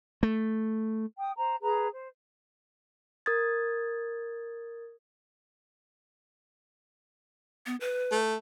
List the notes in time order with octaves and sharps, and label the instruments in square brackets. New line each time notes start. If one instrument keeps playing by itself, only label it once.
[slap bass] A3
[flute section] G5 D#6
C5 A#5
G#4 B4 A#5
C5
[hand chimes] A#4 D#6 G#6 A6
[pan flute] B3
B4
[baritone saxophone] A3